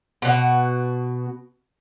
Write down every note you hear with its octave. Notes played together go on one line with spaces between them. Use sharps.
B2 F#4